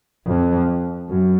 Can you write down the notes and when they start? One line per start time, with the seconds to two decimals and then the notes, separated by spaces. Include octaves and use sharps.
0.26 F2
1.09 F#2